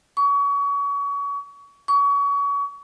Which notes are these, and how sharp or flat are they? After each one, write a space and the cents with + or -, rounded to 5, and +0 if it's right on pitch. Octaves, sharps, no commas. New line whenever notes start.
C#6 +30
C#6 +30